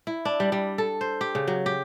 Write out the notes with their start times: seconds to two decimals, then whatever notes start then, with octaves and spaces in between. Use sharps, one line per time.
0.07 E4
0.25 D4
0.40 G3
0.52 G3
0.78 A4
1.01 C5
1.21 G4
1.35 C#3
1.47 F#3
1.66 G4